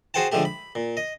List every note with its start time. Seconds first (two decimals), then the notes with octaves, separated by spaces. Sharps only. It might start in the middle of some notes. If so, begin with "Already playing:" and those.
0.14 F#4 G#4 C5 F#5 G5 A5
0.32 D3 F3 G#3 A3 G4
0.45 B5
0.75 A#2
0.97 D#5